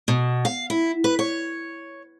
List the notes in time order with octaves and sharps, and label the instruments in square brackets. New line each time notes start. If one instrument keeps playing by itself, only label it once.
[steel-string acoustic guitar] B2
F5
E4
B4
C#5